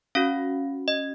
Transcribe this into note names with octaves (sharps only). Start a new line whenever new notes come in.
C#4 F#4 F5
D#5